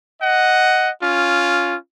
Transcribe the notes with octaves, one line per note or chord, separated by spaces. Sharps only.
D#5 F#5
C#4 F4